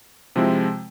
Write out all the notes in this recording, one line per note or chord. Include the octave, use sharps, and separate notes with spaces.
C3 F3 G#3 C4 E4